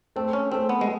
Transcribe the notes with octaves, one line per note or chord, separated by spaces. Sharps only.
A3 C4
C#4
A3 C4
B3
G#3